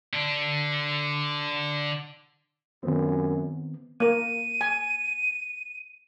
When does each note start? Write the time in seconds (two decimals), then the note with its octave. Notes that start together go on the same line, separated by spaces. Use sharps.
0.13 D3 D4
2.83 F#2 D#3 B3 C4
4.00 A#3 A#4 D#7
4.61 G#5